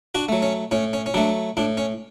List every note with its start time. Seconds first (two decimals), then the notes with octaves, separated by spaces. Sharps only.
0.15 D4 F#4
0.29 F#3 A3
0.42 C#4
0.71 A2 C#4
0.93 C#4
1.06 C#4
1.14 F#3 A3 D4
1.57 A2 D4
1.77 C#4